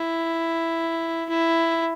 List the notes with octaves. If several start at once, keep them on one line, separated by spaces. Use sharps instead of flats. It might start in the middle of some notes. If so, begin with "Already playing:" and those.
Already playing: E4
E4